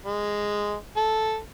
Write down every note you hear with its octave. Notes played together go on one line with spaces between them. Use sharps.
G#3
A4